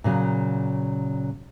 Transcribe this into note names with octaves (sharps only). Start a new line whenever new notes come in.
A#2 C#3 F#3